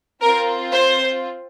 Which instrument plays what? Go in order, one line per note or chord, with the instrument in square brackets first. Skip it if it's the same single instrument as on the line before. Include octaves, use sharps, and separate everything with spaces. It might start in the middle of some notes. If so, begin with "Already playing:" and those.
[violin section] C4 F4 A#4
C5